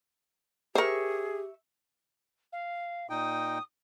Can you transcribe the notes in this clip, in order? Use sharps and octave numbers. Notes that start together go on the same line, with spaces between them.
G4 G#4 A#4 C5 E5 C#6
F5
A#2 D#4 G5 D#6